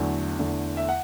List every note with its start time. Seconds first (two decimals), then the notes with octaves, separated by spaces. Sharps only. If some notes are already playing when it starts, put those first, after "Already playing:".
Already playing: E2 D3 F#3 A3
0.39 E2 D3 A3
0.77 E5
0.89 F#5